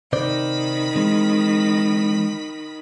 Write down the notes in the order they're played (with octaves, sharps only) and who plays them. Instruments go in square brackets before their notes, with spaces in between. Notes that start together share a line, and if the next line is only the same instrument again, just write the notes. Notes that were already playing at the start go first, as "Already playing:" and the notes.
[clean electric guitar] C3 C5 D5 [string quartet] D#3 B5
[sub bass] E3 [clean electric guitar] G#3 C4